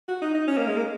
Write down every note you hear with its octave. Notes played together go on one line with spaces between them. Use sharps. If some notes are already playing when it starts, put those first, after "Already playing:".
F#4
D#4
D#4
C#4
A#3
G#3
A#3